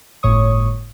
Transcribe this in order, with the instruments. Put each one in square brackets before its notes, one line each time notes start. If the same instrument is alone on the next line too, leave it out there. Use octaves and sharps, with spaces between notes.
[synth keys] G1 A2 C#5 C#6 D#6